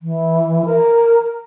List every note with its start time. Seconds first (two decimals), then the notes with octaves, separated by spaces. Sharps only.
0.01 E3
0.65 A#4